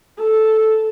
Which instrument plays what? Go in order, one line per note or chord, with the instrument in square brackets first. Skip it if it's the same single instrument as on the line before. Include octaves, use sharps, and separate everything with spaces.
[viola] A4